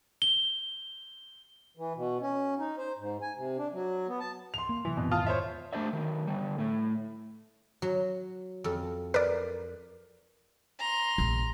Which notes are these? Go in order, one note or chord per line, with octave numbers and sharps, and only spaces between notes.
G7
E3
B2
C#4
D#4
C5
G#2
G#5
C3
D4
F#3
B3
A5
C6 F7
A#3
C3 E3 F#3
D#1 F#2 B2 C4
E2 G#2 D#3 F4 A5 D#6 F6
C5 C#5 E5
A3 D4 G4 C5 D5 E5
D#3 F#3
D3 G3
A2 A3
F#3
F2 A4
A#4 B4 D5
A#5 C6
A#1